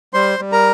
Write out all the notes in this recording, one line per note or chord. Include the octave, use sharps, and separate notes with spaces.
G3 C5 C6
G3
A#4 A#5